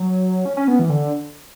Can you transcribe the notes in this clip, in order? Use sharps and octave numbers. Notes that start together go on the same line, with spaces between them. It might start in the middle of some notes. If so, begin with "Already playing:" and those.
Already playing: F#3
C#4
C#4
B3
E3
D3